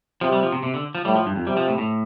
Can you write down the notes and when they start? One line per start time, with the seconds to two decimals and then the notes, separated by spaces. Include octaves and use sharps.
0.21 C3 F3
0.32 G3
0.43 F3
0.52 C3
0.63 C3
0.74 D3
0.95 F3
1.05 A2 G3
1.15 F3
1.26 G2
1.36 F2
1.47 C3 G3
1.57 F3
1.68 A2
1.78 A2